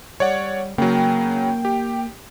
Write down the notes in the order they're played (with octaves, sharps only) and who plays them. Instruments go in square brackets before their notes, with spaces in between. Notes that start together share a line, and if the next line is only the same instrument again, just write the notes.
[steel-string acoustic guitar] G3 [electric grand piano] C#5 D5 F#5
[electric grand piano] C#3 F#3 [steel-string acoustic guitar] A#3 [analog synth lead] G5
[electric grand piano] G4